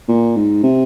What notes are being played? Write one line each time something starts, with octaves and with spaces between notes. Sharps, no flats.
A#2
G#2
C3